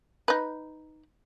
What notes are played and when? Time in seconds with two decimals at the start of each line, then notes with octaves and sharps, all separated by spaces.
0.28 D#4 B4